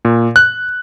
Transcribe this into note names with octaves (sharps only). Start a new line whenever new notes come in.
A#2
F#6